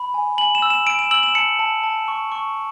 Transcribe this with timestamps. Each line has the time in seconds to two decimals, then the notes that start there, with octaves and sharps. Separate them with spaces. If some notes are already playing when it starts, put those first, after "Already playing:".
Already playing: B5
0.14 G#5
0.38 G#5 F#7
0.55 E7
0.62 E6
0.70 E7
0.87 E6 D7
0.99 E7
1.11 E6 F#7
1.23 E7
1.35 A5 C#7
1.59 A5
1.83 A5
2.08 C#6
2.32 C#6